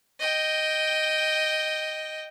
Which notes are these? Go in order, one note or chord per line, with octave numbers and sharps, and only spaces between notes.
D#5 G5